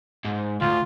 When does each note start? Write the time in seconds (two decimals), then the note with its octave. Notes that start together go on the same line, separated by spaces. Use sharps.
0.25 G#2
0.61 D2 F4